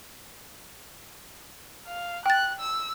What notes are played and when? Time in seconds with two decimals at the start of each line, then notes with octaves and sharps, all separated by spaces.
1.87 F5
2.26 G5 F#6 A6
2.60 E6